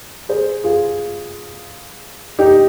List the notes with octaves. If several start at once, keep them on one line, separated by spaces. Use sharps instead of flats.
G#4 C5
F4 G#4
D#4 G4